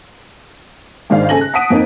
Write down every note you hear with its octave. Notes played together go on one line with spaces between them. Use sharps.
G#1 G#2 D#3 D4 F5
C#3 A4 G#5 A#6 F#7
F#6
F#5 A5 D#6 B6 D7 D#7
F2 A#3 C4 D#4